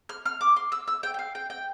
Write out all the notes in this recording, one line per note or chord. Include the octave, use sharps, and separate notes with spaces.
F6
F6
D6
C6
E6
E6
G5
G5
F5
G5
G5